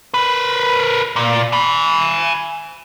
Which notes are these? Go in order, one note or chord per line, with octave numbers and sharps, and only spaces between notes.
A#4 B4
A#2
G#5 B5